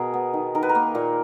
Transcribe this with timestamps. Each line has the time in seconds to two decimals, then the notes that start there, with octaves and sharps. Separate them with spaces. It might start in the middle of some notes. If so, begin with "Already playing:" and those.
Already playing: B2 G#4 A#4
0.14 B3
0.34 D#3
0.55 D#3 A#4
0.63 B4
0.69 A#4
0.75 A#3
0.95 A#2